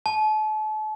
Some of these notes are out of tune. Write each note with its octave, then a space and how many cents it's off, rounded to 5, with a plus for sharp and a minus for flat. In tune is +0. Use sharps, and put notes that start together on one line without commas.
A5 -40